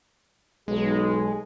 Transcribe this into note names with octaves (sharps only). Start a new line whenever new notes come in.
B1 G#3 G#4